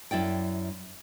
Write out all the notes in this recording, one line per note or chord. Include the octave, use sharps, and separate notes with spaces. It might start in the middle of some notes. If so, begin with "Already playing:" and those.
F#2 E4 D5 G5